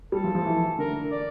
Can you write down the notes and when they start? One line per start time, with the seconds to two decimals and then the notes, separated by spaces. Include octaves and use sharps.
0.12 G3 A4
0.24 F3
0.35 F3
0.45 E3
0.78 D3 A#4
1.12 D5